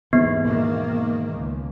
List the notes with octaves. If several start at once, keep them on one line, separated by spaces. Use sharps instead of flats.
D#2 G#2 E3 B3
B2 D#3 A#3
C#2